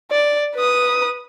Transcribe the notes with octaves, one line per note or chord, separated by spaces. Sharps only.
D5
B4 D#6